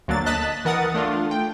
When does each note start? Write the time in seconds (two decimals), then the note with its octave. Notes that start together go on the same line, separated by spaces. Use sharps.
0.08 D2 F#3 A#3 D4 A6
0.26 D#5 A5 F#6 A6 B6
0.65 E3 A#4 F#5 D#6 A6
0.94 A3 D4 F4
1.31 G5